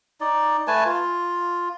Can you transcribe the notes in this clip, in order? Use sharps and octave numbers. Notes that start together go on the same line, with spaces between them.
D#4 D5
A3 B4 G#5 A5
F4